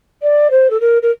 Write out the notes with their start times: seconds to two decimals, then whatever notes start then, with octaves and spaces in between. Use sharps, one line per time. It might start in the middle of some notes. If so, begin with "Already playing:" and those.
0.22 D5
0.50 C5
0.70 A4
0.80 A#4
1.02 A#4